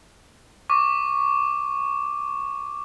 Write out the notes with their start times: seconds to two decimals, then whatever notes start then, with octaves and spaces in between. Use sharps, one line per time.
0.70 C#6 D6